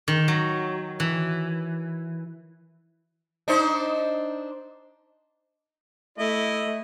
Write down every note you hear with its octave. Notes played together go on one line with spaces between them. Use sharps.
D#3
F#3
E3
D4 D#4 C5
A3 E4 D#5